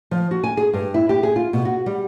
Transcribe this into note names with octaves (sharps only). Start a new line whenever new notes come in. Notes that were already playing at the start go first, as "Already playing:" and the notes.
F3
F#4
G#5
G#4
G2
E4
G4
G#4
F4
B2
F#4
G3